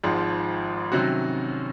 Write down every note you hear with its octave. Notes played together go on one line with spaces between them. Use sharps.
G#1 G#2 F3
C3 D#3 F#3 C#4 F#4